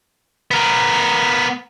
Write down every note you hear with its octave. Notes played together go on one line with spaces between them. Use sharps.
B3 A#4